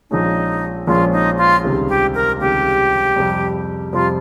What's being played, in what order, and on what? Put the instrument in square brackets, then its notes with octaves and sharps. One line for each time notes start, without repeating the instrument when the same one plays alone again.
[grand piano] A#1 A#2 F3 G#3 C#4 [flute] D#4
[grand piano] A#1 A#2 F3 G#3 C#4 [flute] F4
[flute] D#4
F4
[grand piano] C#2 C3 D#3 G3
[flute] G4
A#4
[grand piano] C#2 C3 D#3 G3 [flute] G4
[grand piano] F2 C3 G3
[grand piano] F2 C3 G3 [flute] F4